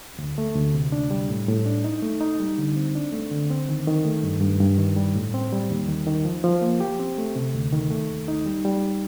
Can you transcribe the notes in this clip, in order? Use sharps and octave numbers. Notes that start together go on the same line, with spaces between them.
D2
A3
D2
C3
D4
G3
A2
A2
D4
D#4
A3
D#4
G3
D3
C4
D4
A3
D3
C4
D#3
D#3
A3
G2
G2
G2
D#3
G3
A2
C4
G3
D#2
D#3
D#3
F3
F3
A#3
G4
C4
A3
C3
D2
D#3
A3
D#2
D#4
G3
G3